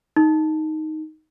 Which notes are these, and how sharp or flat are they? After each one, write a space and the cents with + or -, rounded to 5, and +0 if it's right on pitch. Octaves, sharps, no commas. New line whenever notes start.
D#4 +5